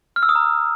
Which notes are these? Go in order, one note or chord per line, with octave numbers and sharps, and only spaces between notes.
F6
E6
D#6
A#5